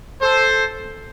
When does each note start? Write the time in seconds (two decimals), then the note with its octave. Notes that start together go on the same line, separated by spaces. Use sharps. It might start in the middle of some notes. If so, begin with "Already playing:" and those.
0.22 A4 C5